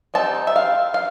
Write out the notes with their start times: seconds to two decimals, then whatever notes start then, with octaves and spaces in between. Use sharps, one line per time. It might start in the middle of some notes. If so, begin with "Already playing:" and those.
0.14 G3 C4 D#4 A5
0.47 E5
0.56 F5
0.94 F5